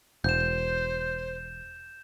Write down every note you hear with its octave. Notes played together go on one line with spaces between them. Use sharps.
E1 C5 G6 E7